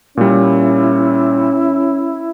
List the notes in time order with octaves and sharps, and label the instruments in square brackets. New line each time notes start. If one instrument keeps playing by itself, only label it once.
[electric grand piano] A#2 G3 [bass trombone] C#4 [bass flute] E4